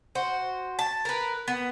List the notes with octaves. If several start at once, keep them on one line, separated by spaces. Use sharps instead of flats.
F#4 C5
A5
A#4 B4
B3